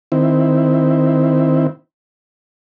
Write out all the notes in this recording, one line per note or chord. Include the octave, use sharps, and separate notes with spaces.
D#3 C4 E4